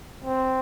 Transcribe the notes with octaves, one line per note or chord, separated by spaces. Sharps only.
C4